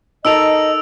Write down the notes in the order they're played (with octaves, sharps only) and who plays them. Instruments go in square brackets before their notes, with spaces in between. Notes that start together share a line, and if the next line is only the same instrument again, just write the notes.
[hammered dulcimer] D#4 A4 A#4 [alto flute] D#5 [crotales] E6 D7 F7